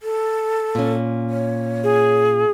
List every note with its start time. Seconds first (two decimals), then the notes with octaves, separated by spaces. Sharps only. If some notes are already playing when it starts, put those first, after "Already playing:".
0.02 A4
0.75 A#2 C#4
1.30 C#5
1.84 G#4